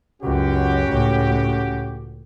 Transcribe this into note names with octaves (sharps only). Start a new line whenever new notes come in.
C#2 F#2 C#4 F#4 G4
C#2 A2